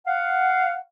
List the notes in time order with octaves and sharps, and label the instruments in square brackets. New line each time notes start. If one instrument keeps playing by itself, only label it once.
[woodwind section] F5 F#5